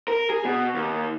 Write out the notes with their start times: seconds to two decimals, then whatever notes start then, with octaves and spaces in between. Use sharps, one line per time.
0.08 A#4
0.30 G#4
0.45 B2
0.75 D#2